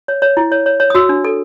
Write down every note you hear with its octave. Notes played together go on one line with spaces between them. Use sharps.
C#5
C#5
E4
C#5
C#5
C#5
D#6
F#4 E6
D4
A4